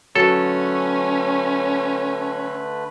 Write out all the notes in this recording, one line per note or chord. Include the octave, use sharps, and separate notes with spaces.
D3 F#3 A3 C#4 A4 B4